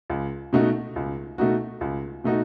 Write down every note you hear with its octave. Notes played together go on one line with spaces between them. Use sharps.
C#2
B2 A3 D#4 F#4
C#2
B2 A3 D#4 F#4
C#2
B2 A3 D#4 F#4